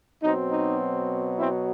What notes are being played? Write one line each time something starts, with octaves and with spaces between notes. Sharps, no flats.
B2 F#3 C4 D#4
D#4
C4 E4